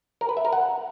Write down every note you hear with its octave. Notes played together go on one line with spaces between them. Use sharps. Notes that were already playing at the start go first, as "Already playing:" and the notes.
A#4
B4
E5
A#4
F#5